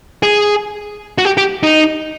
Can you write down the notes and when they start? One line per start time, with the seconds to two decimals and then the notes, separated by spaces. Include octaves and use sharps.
0.23 G#4
1.18 F#4
1.25 G4
1.37 G4
1.63 D#4